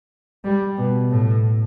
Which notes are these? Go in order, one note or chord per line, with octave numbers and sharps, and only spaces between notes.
G3
B2
A2